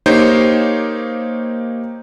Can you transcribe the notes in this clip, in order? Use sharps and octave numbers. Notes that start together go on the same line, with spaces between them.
A#3 D#4 G4 C5 C#5